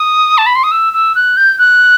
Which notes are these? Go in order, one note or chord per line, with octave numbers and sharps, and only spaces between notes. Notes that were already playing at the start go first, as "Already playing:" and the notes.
Already playing: D#6
A5
B5
C6
D#6
E6
E6
F#6
G6
F#6